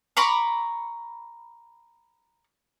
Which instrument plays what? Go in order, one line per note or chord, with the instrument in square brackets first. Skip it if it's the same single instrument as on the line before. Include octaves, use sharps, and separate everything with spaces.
[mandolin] A#5 B5 C#6 D6